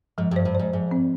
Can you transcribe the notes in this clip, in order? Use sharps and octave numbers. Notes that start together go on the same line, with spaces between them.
G#2 F3
G2
C5
G2
G#2 C5
G#2 F3
C4